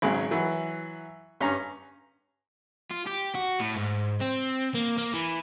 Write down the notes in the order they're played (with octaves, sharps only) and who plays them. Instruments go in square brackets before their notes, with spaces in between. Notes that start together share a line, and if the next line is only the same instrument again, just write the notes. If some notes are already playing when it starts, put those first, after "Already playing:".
[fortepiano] G#1 C#3 F#3 G#3
E3 F#3
G2 C#4 A#5
[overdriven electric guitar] F4
G4
F#4
A2
G#2
C4
A#3
A#3
E3